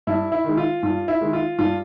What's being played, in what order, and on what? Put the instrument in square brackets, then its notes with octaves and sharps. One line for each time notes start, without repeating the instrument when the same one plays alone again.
[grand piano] G2 E4
E4
D#3 G#3
F4
G2 F4
E4
D#3 G#3
F4
G2 F4